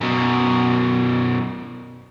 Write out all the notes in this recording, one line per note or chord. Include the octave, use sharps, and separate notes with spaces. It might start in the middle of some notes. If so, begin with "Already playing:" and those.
F#2 B2